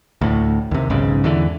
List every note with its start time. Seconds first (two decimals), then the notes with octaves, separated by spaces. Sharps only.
0.21 D2 A2
0.71 D#2 C3
0.90 B1 G#2 C#3
1.24 E2 D3 E3